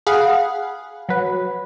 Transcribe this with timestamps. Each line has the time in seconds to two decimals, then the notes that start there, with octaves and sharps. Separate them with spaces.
0.07 G#4 F5 F#5 B5
1.09 F#3 B4